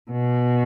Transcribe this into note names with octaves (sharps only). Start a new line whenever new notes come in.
B2